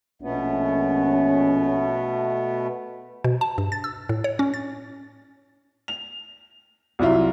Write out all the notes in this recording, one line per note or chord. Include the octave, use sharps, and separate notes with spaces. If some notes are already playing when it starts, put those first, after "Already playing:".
A#1 B2 A3 B3 C#4
B2
A5
G2
A6
E6
A2
C#5
C#4
A6
F7
C2 F#3 E4 F4